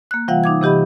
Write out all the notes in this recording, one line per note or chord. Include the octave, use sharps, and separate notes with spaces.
A#3 F#6
C3 E3 G3 F4 F5 F#5
D#4 D6 G#6
C3 E3 G4 D#5 B5